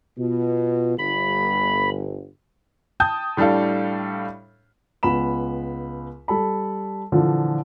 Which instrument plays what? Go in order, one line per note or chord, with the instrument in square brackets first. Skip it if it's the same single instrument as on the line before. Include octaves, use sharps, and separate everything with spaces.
[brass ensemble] B2 F4
[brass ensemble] G1 [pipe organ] B5
[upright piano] G5 A5 D#6 G6
A2 G3 D4 A4 F5
[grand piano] C#2 B3 B5 E7
G3 A4 B5
A#2 D3 E3 F3